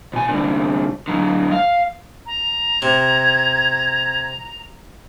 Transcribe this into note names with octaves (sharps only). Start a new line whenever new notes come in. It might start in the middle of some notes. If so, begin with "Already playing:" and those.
B2 G#5
C2 D3
D3 F#3
F5
A#5
C3 G#6